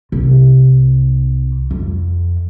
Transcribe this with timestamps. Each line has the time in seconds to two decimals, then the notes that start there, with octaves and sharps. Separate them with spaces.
0.12 C2
1.71 F2